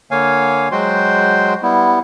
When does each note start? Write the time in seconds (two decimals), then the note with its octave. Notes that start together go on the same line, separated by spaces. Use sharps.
0.11 D3 A#3 C#5 F5 G#5
0.72 F#3 G#3 F#4 C5 G5 C6
1.63 G3 B3 E4